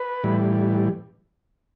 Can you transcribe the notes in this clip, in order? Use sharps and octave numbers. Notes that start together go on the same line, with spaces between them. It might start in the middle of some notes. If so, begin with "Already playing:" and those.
Already playing: B4
A2 E3 G3